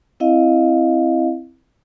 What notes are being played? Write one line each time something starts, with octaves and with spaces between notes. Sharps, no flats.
C4 E4 D#5 F5